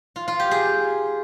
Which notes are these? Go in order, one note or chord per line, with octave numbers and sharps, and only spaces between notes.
F4
F4
G4
G#4